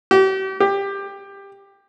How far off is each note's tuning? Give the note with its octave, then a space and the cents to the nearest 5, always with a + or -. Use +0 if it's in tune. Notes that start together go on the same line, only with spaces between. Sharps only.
G4 -40
G4 +15